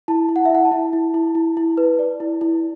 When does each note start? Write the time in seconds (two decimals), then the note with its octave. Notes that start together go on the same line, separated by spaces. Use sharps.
0.08 E4 A5
0.29 E4
0.36 F#5
0.45 E5
0.50 E4 F#5
0.65 A5
0.72 E4
0.93 E4
1.14 E4
1.35 E4
1.57 E4
1.77 B4
1.99 D5
2.20 E4
2.41 E4